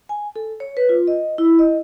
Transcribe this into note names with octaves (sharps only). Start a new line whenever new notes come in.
G#5
A4
C#5
B4
F4
D#5
E4
D#5